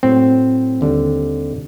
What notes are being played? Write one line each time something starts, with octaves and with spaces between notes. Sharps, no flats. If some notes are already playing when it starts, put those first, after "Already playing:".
A2 F#3 C4
D#2 D3 G3